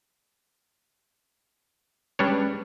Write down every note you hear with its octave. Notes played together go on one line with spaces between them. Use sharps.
G3 G#3 C#4 D4 B4 C#5